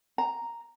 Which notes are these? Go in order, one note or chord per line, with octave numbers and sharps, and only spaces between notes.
A#5